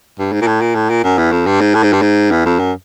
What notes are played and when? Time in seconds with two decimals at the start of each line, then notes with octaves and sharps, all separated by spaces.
0.19 G2
0.32 G#2
0.41 A#2
0.47 A2
0.61 A#2
0.75 A2
0.90 A#2
1.04 F#2
1.18 E2
1.32 F2
1.46 G2
1.60 G#2
1.74 A2
1.83 G#2
1.93 G2
2.02 G#2
2.31 E2
2.45 F2
2.59 F#2